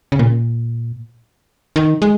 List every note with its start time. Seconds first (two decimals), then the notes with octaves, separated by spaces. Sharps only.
0.12 C#3
0.19 A#2
1.76 D#3
2.02 G#3